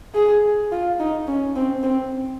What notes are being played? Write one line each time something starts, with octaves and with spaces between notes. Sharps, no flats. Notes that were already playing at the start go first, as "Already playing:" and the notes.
G#4
F4
D#4
C#4
C4
C4